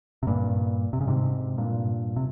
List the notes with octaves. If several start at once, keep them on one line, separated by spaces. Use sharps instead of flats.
C3
G2 A#2
C3
C#3
G#2 C3
G2 A#2
C3